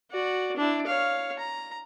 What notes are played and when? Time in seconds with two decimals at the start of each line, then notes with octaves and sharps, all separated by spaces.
0.11 F#4 D5
0.57 D4 E4
0.86 C#5 F5
1.39 A#5